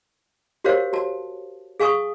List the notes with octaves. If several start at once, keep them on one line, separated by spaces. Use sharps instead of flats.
F#4 G4 A#4 C5 C#5 F5
F#4 A5
G#4 F5 G#5 C#6 D#6